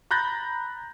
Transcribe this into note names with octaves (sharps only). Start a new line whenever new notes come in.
A#5 B5 F#6 G6 A6 A#6